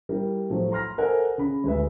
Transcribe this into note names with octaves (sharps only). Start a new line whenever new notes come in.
G3 E4 A#4
A2 F3 F#3 A3
A#5 C6 F6 A#6
A4 A#4 C5 D#5 F#5 G#5
C#3 B5
D2 G#3 B4 E5